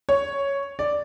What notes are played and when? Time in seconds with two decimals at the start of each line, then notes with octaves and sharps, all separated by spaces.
0.09 C#5
0.79 D5